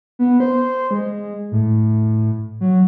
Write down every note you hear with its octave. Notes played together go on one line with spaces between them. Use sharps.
B3
C5
G#3
A2
F#3